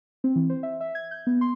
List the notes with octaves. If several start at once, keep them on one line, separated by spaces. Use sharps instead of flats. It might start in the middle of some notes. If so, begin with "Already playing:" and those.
C4
E3
C5
E5
E5
G#6
G6
B3
C6